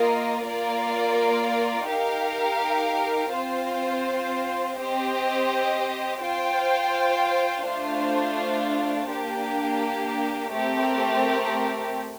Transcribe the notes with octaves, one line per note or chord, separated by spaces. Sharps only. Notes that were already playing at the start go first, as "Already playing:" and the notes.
Already playing: A#3 F4 A#4 D#5
A#3 F4 A#4 D5
D#4 G4 A#4 F5
C4 F4 C5
C4 G4 C5 D#5
F4 C5 G5
A3 D4 F4 C5
A#3 D4 G4
A3 C4 G4 A#4